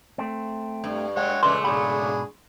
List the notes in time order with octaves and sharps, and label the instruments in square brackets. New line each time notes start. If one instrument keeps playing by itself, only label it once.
[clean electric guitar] A3 C4
[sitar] G2
[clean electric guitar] G#3 [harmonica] C#5 F#5 G5
[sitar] A#2 C#3 A3 [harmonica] B4 D5 [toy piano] C6
[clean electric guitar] G#2 B2 B5 [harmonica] D4 G#4